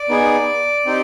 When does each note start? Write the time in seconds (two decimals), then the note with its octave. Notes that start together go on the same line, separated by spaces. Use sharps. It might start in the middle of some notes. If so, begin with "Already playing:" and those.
Already playing: D5
0.09 B3 D#4 G#4
0.86 C4 D#4 G4